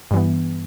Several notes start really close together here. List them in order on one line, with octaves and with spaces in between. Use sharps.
G2 E3 B3